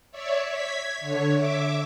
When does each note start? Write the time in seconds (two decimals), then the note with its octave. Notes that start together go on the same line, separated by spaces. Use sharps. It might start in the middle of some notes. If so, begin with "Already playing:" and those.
0.11 C#5 D5 E5
0.48 G#6 B6
1.00 D3 C#5
1.34 E5 D6